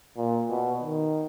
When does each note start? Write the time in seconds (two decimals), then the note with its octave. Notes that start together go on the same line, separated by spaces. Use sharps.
0.17 A#2
0.50 B2
0.82 D#3